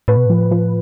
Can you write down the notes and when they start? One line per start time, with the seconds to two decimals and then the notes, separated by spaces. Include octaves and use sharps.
0.08 A2 B4
0.17 B2
0.26 A2 F3
0.51 F3